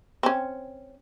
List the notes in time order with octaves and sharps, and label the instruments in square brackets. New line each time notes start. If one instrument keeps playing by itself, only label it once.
[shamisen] C4 C#4